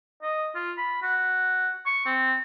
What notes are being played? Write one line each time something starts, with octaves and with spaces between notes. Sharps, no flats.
D#5
F4
B5
F#4
C#6
C4